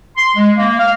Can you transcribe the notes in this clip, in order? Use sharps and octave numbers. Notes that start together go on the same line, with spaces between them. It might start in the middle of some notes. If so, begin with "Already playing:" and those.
C6
G#3
A#3
F5